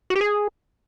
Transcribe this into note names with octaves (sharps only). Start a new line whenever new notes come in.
F#4
G4
G#4